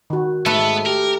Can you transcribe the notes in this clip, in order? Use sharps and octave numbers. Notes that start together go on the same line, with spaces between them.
D#3 F#4
G#2 A3 B3 B4
G4 A#4